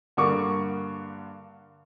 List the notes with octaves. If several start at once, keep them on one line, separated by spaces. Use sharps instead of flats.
G2 D3 A#3 C#6 D6